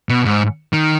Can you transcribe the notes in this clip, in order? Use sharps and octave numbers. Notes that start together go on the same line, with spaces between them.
B2
G#2
D#3